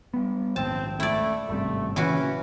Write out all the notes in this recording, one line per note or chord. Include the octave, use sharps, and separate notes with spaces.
G3 B3
A#1 D#2 G#2 C4 A5
A3 E4 D5
G#1 G2 C3 A3
A#2 C#3 E3 C#4 F#4